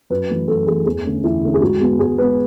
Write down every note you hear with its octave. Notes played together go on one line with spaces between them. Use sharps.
F#2 B4
E3 A3
F#2 A4
E3 A3 G#4
E2 G#4
D3 A3 C#4
E2 E4
D3 A3 C#4
G#4
G#2 F#4
G#3 B3
G#2 G#4
G#3 B3 B4